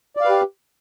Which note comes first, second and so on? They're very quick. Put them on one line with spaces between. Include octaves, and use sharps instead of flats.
D5 F5 B4 G4